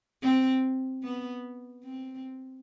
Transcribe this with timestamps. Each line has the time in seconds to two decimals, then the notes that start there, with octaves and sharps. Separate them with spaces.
0.22 C4
1.03 B3
1.83 C4